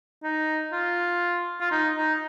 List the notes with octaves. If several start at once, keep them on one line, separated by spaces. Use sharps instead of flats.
D#4
F4
F4
D#4
D#4